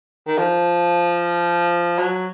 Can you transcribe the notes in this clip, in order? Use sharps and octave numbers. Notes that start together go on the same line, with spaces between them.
D#3
F3
F#3